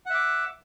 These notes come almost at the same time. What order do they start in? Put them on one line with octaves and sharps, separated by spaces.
F#5 E5 D6